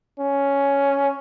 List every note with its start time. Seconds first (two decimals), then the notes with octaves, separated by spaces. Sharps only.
0.20 C#4